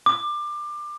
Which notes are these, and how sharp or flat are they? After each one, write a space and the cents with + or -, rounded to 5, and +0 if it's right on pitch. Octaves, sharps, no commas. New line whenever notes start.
D6 +25